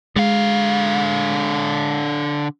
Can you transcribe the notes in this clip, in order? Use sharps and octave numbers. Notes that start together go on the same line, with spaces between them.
D3 G#3 F5